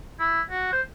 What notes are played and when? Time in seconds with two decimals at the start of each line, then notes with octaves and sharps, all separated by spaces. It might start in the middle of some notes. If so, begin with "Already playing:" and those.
0.20 E4
0.51 F#4
0.73 C5